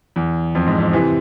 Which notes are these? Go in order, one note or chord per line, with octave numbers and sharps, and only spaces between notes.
E2
F2
G#2
F2
C3 E3